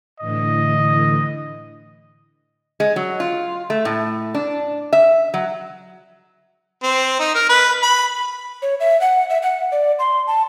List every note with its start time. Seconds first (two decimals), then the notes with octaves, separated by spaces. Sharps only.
0.20 A2 D3 E3 D#5
2.80 G#3
2.96 F#3
3.20 F4
3.70 A3
3.85 A2
4.35 D4
4.93 E5
5.34 F#3
6.83 C4
7.19 D#4
7.35 A#4
7.49 B4
7.82 B5
8.62 C#5
8.80 E5
9.01 F#5
9.30 E5
9.43 F#5
9.72 D5
9.99 C6
10.27 A5